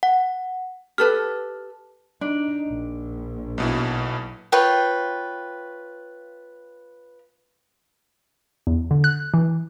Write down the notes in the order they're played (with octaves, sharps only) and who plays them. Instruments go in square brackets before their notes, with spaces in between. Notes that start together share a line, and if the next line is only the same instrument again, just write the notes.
[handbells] F#5
[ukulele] G4 A4 B4 [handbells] F6
[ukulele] D4 [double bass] D#4
[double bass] A#1
[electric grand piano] B1 B2 E4
[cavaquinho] F4 B4 C#5 G5
[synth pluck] E2
D3
F#6
E3